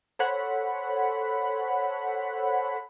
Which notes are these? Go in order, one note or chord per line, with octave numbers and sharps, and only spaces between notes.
A4 C5 C#5 F#5 B5